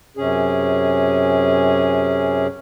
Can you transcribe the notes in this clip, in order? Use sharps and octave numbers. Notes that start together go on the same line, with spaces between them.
F#2 C3 C#4 G#4